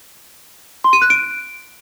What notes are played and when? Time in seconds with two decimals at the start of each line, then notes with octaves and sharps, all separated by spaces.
0.84 C6
0.93 D#7
1.02 F#6
1.10 D7